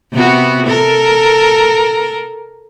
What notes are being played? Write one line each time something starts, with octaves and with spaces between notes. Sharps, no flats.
C3 B3 F#4
A4 A#4